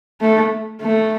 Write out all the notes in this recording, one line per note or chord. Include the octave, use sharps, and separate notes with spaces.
A3
A3